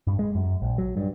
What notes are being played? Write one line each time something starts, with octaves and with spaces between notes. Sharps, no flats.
G2
G#3
F#2
A#1
F#3
G2